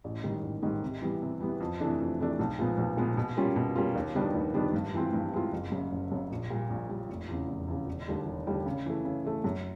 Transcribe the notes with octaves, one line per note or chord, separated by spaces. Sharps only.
A1
G#2 D#3 G3
A1
G#2 D#3 G3
C3
E3 G3 B3
C3
E3 G3 B3
F2
C3 E3 A3 D4
F2
C3 E3 A3 D4
B1
A#2 F3 G#3 B3
B1
A#2 F3 G#3 B3
B2
G3 A#3 C#4 F4
B2
G3 A#3 C#4 F4
D#2
D#3 G3 B3 D4
D#2
D#3 G3 B3 D4
G2
E3 G#3 C4 F4
G2
E3 G#3 C4 F4
F#1
F#2 C#3
F#1
F#2 C#3
A#1
A#2 G3
A#1
A#2 G3
F1
E2 C#3
F1
E2 C#3
E1
D#2 D3 G3
E1
D#2 D3 G3
C#3
E3 A3
C#3
E3 A3
F#2